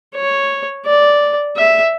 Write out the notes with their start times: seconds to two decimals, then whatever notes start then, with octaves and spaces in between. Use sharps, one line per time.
0.15 C#5
0.86 D5
1.57 E5